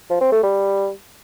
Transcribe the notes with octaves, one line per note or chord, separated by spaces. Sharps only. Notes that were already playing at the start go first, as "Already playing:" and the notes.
F3
C4
A3
G3